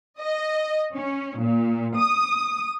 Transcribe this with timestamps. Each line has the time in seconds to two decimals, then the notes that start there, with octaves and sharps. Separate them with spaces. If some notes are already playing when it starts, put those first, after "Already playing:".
0.19 D#5
0.93 C#4
1.37 A#2
1.97 D#6